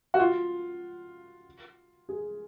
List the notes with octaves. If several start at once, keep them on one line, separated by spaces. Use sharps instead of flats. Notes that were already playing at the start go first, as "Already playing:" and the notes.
F#4
F4
G#4